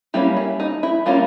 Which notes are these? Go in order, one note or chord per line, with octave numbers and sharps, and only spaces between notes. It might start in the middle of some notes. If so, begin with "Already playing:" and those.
G3 A#3 C#4 E4
E4
D#4
E4
G3 A#3 C#4 F4